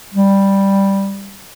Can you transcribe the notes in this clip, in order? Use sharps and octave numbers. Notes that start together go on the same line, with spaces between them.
G3